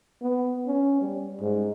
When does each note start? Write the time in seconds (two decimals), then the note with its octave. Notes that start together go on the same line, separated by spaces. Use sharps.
0.22 B3
0.67 C#4
1.02 G3
1.41 G#2